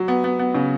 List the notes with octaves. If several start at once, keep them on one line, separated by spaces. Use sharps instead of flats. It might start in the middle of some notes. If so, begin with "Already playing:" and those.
Already playing: F#3
B3
B3
B3
C#3